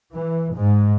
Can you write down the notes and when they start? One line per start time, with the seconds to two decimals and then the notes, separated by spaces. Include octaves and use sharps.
0.14 E3
0.55 G#2